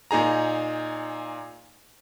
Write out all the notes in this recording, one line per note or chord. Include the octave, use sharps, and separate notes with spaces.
A#2 D#4 G#4 A#5